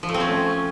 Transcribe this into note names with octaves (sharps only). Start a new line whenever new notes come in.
F3
A3
C4
C#4